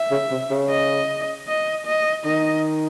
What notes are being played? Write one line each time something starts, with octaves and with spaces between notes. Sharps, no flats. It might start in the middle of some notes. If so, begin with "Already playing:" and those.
Already playing: E5
C#3
C3
C#3
D#5
D#5
D#5
D#3 D#5